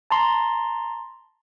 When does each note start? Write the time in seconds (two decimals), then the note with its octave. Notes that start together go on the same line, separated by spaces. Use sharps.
0.10 A5 A#5 C6